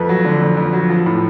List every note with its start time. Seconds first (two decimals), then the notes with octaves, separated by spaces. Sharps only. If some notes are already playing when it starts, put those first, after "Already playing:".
Already playing: F2 A4 B4
0.09 F#3
0.25 D3
0.41 F2
0.57 F2
0.73 F#3
0.90 F3
1.06 A2